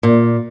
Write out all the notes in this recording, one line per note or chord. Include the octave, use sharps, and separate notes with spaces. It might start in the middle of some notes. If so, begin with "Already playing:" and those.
A#2